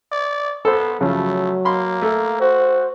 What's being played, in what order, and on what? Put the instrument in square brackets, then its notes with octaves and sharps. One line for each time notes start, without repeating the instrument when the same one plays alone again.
[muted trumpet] D5
[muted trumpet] B3 [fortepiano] A4 C5
[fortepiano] C#3 F3 [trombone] F#3 [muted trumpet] A3
[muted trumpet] A#3 [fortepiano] B5 C6
[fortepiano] A3
[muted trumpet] F#4 [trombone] C5